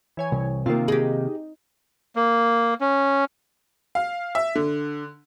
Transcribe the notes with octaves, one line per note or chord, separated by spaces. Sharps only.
E3 C#5 G#5
C2
C3 D#3 A#3 C4 F4
D#4 G4 G#4
A#3
C#4
F5
E5
D3